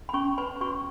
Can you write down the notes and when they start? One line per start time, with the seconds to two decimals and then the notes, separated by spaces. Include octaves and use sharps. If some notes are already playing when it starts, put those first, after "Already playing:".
0.09 B5
0.14 C#4 C#6
0.38 B4 B5
0.61 F#4 C#6